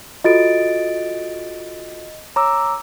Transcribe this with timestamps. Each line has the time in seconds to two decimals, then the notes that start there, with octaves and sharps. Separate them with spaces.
0.24 F4 F#4 A4 D#5 A6 D7
2.36 C#5 A#5 D6 E6